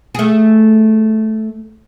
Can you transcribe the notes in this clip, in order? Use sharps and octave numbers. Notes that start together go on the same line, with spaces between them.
A3 G#4